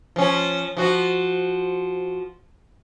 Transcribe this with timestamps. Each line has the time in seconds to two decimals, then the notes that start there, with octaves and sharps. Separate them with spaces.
0.16 F3 C#4
0.77 F3 F#4